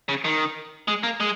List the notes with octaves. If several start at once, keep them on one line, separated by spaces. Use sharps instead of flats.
C#3
D#3
G#3
A#3
G#3